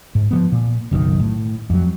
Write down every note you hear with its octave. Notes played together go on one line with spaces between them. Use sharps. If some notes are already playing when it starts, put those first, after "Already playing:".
G#2
F3 F#3 B3
A#2
F#1 B1 A2 D#3
A2
F2 F#3